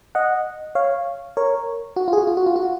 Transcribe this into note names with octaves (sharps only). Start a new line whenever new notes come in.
D#5 F#5
C#5 F5
A#4 C#5
F#4
F4
G#4
F#4
F4
F#4
F4
F#4